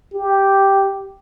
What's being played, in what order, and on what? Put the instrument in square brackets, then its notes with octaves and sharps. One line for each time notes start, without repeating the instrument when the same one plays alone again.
[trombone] G4